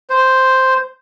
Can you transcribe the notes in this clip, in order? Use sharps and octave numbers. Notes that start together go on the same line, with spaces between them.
C5